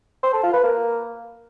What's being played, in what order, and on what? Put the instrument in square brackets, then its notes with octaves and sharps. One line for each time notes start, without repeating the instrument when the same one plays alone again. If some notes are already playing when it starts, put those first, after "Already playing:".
[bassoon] C5
A4
F4
B4
A#3